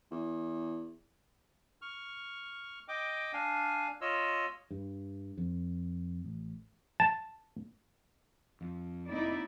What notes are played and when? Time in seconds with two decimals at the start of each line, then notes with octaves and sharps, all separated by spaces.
0.11 E2
1.82 C#6 F6
2.88 D#5 G5 D6
3.33 D4 F5 G#5
4.01 F4 C#5 D#5 E6
4.71 G2
5.37 F2
6.24 A1
7.00 A5
8.61 F2
9.10 F1 A#3 C4 D#4 E4 D5